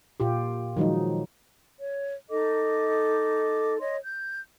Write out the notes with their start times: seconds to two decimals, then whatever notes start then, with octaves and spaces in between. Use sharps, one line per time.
0.20 A#2 F4 G4
0.77 D#3 F3 F#3 G#3 D#4
1.80 C#5
2.30 D#4 A4 D#5 D6
3.80 C#5 D#5 C6
4.05 G6